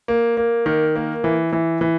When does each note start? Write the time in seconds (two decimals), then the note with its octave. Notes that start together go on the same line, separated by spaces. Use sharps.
0.08 A#3
0.37 A#3
0.66 D#3
0.96 A#3
1.24 E3
1.52 E3
1.81 E3